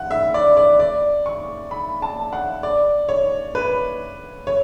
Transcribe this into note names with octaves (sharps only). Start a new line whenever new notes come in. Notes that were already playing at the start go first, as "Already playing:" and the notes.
Already playing: F#5
E5
D5
D5
D5
C#6
B5
A5
F#5
D5
C#5
B4
C#5